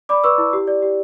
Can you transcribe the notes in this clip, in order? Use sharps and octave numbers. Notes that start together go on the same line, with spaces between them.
D5 B5 D6
B4 C#6 E6
E4
G4
D5
G4